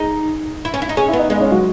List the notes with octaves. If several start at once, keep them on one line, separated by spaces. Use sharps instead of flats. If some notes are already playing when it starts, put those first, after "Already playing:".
Already playing: D#4 G#4
E4
C#4
E4
D#4
C#4 G#4 G#5
E4 E5
B3
D#4 D#5
G#3 B3 B4
D#5
C#4 C#5
F#3 F#4